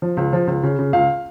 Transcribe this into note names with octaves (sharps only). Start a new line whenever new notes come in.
F3
C#2
F3
C#2
C#3
C#3
C#2 F5